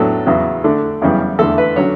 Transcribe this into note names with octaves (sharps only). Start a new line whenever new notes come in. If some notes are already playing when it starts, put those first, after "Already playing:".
Already playing: A2 F#3 B3 D4 A4
E2 C#3 F#3 B3
D3 A3 D4
F#2 C#3 E3 G3 B3
E2 D3 A3 A4
B4
D3 F#3 C#4 C#5